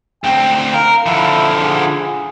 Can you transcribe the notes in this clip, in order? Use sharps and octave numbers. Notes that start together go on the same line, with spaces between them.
D2 C4 G5
A#4 F5
D3 F3 E4
G#4